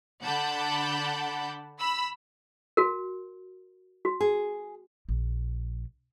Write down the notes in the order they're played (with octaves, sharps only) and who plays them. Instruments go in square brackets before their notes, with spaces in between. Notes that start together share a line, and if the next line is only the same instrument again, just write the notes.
[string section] D3 F#5 A5 B5 D6 G6
B5 E6
[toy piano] F#4 A#4
F#4
[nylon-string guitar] G#4
[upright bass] A#1